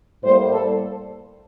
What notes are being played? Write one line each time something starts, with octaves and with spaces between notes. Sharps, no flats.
A2 G3 A#3 C5
A4